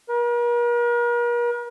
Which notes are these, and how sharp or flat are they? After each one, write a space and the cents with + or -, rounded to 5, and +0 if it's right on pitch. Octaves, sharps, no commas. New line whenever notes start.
A#4 +45